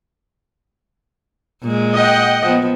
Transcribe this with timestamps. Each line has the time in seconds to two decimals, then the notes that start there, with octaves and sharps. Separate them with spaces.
1.63 A#2 G#3
1.96 D#5 F#5 G5
2.44 F3 B3